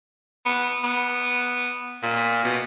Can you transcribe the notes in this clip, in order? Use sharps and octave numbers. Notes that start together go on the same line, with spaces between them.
B3
B3
A#2
B2